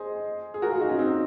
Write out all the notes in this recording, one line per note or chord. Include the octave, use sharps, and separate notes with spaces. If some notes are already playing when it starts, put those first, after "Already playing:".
Already playing: G#4 C5 D#5
G#4
F#4 A#4
F4 G#4
D#4 F#4
C#4 F4
C4 D#4